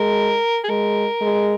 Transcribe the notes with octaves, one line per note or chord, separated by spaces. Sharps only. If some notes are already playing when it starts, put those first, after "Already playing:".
Already playing: G#3 A#4
G#4
G#3 A#4
G#3